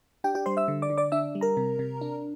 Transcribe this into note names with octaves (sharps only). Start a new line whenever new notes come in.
D4 G4 G5
G4 G5
G3 C5 C6
E5 E6
D3
D5 D6
D3
D5 D6
D4 E5 E6
G3
A#4 A#5
C3
C3
D4